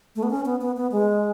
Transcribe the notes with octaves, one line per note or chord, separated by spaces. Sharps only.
A3
B3
C#4
B3
B3
B3
G#3